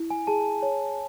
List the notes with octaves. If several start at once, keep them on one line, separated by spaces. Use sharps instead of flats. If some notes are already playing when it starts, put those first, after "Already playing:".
Already playing: E4
G#5
G#4 A5
C#5